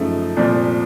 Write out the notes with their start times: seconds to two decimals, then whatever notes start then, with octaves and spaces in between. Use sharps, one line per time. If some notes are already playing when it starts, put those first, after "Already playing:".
Already playing: F#2 C#3 F3 A3 D#4
0.36 C2 A#2 F3